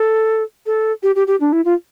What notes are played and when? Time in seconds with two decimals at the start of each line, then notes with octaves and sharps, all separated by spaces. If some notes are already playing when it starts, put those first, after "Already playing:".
Already playing: A4
0.66 A4
1.03 G4
1.16 G4
1.27 G4
1.40 D4
1.52 E4
1.65 F4